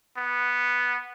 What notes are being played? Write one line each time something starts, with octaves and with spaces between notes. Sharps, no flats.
B3